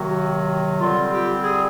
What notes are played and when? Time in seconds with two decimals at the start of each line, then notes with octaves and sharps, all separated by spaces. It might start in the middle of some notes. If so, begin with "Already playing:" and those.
Already playing: C3 D#3 F#3 A#3 F#4
0.80 D3 G3 C4 F4
1.12 G4
1.43 G#4